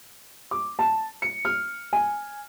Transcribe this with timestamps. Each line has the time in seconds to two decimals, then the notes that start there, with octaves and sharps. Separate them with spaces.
0.51 D6
0.79 A5
1.22 C#7
1.45 F6
1.93 G#5